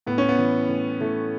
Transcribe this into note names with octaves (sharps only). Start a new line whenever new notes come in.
A2 B3
C#4
B3
E3
A2
E3 A3